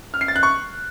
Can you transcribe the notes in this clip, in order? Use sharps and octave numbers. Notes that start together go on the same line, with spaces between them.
F6
C7
A6
F#6
C#6